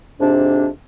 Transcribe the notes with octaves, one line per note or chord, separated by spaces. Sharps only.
F2 G#2 C3 D4